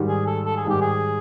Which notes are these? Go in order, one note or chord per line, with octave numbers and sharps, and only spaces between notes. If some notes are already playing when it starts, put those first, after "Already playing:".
Already playing: G#2 D#3 G3
G#4
A4
A4
G#4
G#2 D#3 G3 G4
G#4